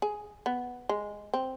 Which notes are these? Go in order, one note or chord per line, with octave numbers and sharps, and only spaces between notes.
G#4
B3
G#3
C4